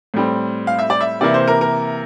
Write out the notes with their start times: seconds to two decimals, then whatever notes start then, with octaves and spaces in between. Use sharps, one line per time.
0.14 A2 G3 C4
0.67 F5
0.79 E5
0.90 D5
1.01 E5
1.21 C3 E3 A#3 E4 D5
1.34 C5
1.48 A#4
1.61 A#4